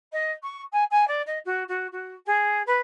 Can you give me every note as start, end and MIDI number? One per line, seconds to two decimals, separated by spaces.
0.12 0.31 75
0.42 0.62 85
0.72 0.84 80
0.91 1.07 80
1.07 1.22 74
1.26 1.38 75
1.45 1.63 66
1.68 1.87 66
1.92 2.14 66
2.26 2.62 68
2.66 2.80 71